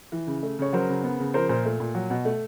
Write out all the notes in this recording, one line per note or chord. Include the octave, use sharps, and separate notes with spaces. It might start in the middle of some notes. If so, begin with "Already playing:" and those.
E3
C#3
A3
C#3 C#5
F#3 A#4 C5
C#3
B3
C#3
F3 A#4 C5
A#2 A#4 C5
A3
A#2
F#3
B2
A3